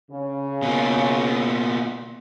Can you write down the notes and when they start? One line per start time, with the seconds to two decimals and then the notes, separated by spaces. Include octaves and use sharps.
0.11 C#3
0.62 B2 A#3